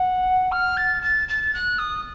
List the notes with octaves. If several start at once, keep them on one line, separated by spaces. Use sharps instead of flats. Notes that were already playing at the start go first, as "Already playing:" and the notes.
Already playing: F#5
F6
A6
A6
A6
F#6
D#6